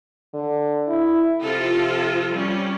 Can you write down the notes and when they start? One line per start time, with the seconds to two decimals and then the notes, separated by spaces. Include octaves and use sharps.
0.34 D3
0.88 E4
1.44 C3 F3 F4 A4
2.31 G3 C#4